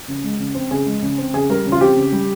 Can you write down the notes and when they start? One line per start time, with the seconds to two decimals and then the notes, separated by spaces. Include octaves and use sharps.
0.08 C#3
0.24 G#3
0.40 C#3
0.54 C4
0.71 C#3 G#4
0.86 G#3
1.02 C#3
1.18 C4
1.33 C#3 G#4
1.49 G3 A#4
1.66 C#3
1.72 F4
1.81 C4 G4
1.97 C#3
2.12 G3